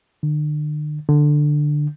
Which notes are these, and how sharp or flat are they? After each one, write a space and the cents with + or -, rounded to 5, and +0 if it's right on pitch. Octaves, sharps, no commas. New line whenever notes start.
D3 +40
D3 +10